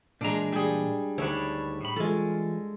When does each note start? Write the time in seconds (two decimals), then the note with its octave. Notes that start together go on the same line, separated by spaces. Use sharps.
0.21 A#2 E3 G#3 D4 A#5
0.52 G3 G#4
1.18 D2 D#3 D4 E4 C#5 A5 B5
1.81 A2 B5
1.96 E3 G#3 F4 A4